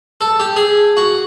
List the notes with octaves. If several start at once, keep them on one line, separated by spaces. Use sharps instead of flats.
A4
G4
G#4
F#4